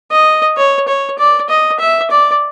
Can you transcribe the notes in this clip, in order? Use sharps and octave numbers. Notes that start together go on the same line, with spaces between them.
D#5
C#5
C#5
D5
D#5
E5
D5